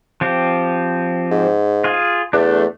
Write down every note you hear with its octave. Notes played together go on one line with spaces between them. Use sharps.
F3 C4 G4
G#2
F4 G#4
E2 A3 D4